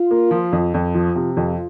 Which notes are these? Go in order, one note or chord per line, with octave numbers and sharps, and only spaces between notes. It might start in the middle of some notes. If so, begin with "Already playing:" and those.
Already playing: F4
A#3
F3
F2
F2
F3
C3
F2 F4